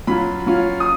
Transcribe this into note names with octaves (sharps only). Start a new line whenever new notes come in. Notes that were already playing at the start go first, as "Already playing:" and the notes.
F#3 C#4 F4 B5
F#3 C#4 F4
D#6